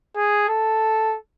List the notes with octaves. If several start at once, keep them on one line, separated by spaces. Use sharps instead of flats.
G#4
A4